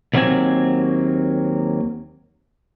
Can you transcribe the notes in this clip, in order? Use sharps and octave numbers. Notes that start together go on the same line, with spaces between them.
D#2 D#3 F#3 A#3 C4 G#5